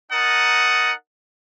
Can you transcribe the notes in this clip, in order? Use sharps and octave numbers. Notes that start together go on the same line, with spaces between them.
D#4 A#4 F#5 A5 D#6